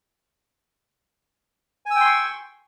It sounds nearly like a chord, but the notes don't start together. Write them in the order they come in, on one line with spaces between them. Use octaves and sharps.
G#5 E6 G5 C6 C#6